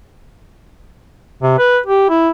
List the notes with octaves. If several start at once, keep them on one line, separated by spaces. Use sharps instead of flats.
C3
B4
G4
E4